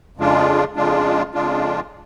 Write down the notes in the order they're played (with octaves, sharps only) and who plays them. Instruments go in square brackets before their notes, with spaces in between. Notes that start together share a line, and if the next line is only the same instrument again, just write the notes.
[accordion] F2 C#3 G#3 D4 F4
F2 C#3 G#3 D4 F4
F2 C#3 G#3 D4 F4